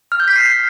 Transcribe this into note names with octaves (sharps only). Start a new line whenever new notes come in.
F6
G6
B6
C7